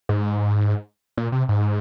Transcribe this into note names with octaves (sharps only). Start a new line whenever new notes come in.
G#2
A#2
C3
G#2